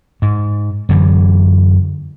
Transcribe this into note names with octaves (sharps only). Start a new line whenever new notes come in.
G#2
F#2 D3 E3